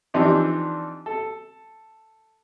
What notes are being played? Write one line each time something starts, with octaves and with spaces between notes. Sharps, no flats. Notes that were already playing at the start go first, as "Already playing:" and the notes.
E3 F3 C4 D4 D#4 G4
A4